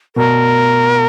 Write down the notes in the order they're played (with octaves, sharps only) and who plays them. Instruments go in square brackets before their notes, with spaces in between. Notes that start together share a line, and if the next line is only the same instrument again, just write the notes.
[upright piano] B2 [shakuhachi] A#4